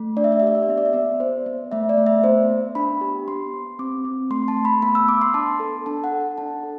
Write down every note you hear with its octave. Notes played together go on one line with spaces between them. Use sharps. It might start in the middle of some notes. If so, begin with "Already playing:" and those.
Already playing: A3
D4 D5
E5
D5
E5
G4 D5
E5
D5
B3 E5
D5
E5
B3 D5
B3 C5
B3
A3 E5
D5
A3
E5
B3 C5
B3
D4 B5
G4
B3 C6
B3
C4 D6
C4
A3 C6
A5
A3
B5
B3 B5
E6
B3 D6
C6
D4 A5
A4
D4 A5
F#5
A4
F#5
D4 A5
A4